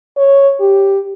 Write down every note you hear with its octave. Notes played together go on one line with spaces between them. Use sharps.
C#5
G4